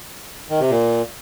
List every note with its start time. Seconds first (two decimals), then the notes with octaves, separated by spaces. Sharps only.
0.50 D#3
0.60 C3
0.70 A#2